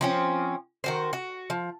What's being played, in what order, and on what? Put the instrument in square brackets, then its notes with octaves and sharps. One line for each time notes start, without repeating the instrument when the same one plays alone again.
[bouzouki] F3 C4 C#4
D#3 F#4 C5
F#4
F3